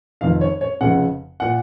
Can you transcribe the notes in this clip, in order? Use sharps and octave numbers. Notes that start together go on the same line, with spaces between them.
F1 F2 D#3 F5
C#5
C#5
F1 F2 C#3 F#5
A#2 F#5